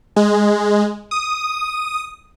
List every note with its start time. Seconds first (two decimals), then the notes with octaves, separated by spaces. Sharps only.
0.16 G#3
1.11 D#6